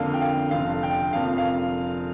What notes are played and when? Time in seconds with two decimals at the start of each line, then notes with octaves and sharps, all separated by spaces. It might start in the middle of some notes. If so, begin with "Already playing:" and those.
Already playing: F2 D3 A#3 F5
0.14 G5
0.21 F5
0.51 F1 F2 D3 F5
0.83 G5
1.13 F1 F2 F3 A#3 F5
1.38 F5